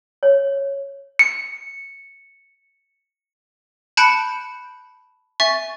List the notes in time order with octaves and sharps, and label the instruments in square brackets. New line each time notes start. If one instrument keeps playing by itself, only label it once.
[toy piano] C#5
[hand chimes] C#7
[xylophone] A5 B5 F#6 G6 C#7 D7
E5 G#5 C#6 A6